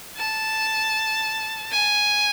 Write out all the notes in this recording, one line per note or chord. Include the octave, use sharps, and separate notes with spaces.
A5
G#5